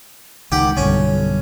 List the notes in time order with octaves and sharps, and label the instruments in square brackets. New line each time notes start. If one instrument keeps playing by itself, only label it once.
[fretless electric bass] C#2 D#3 [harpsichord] G4 F#5
[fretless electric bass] B1 G2 D3 [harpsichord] C#4